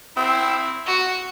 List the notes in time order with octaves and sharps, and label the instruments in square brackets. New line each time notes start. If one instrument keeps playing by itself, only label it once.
[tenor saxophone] C4 [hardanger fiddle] E4
[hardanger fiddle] F#4